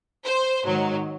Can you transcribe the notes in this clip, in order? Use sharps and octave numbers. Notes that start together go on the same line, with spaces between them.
C5
G#2 D#3 F#3